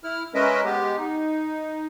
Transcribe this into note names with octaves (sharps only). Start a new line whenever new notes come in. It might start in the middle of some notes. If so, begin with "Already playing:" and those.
E4 F6
G#3 C#4 A#4 B4 D#5 E5
G#3 B3 G4
D#4